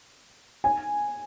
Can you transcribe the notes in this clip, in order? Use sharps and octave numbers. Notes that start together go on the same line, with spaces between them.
G#5